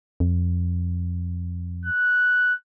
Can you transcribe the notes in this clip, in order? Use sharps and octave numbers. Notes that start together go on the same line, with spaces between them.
F2
F#6